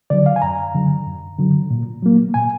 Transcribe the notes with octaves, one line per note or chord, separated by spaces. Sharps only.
D3 F#3 D5
F5
G#5
F#2 A#5
D3 F#3
F#2
D3 F#3
A#2
F#3 A#3
A#2 G#5